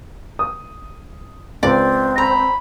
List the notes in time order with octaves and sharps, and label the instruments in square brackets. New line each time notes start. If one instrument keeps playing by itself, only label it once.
[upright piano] D#6
[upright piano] C#2 [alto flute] C4 [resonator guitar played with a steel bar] D5
[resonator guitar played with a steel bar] A#5 [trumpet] B5